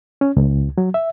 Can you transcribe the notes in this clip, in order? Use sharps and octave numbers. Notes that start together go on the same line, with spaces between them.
C#4
C#2
F#3
E5